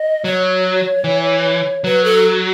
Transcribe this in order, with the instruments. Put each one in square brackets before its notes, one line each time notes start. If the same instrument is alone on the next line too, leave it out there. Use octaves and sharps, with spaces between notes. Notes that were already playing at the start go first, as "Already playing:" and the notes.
Already playing: [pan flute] D#5
[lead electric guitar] F#3 [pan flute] C#5
[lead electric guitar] E3
[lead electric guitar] F#3 [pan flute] B4
[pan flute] A4